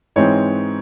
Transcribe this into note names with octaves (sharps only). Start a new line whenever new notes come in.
G#2 E3 G#3 C4 C#5